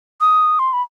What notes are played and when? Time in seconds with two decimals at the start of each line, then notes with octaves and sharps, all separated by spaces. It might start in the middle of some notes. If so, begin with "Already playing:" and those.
0.21 D#6
0.59 C6
0.73 B5